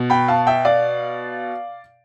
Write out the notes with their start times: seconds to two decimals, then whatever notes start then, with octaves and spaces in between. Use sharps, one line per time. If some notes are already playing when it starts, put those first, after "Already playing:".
Already playing: B2
0.10 G5 B5
0.28 F5 A5
0.47 E5 G5
0.65 D5 F5